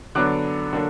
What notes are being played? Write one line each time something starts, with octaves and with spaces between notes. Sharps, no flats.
D3 F#3 B3 D4 D6 F#6
D3 F#3 A#3 D4